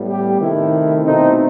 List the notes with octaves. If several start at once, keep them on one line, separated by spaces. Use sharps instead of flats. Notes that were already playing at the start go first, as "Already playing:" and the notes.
Already playing: A2 G3 B3
G4
C3 D#3 A3 C4 E4
B2 A3 C4 D#4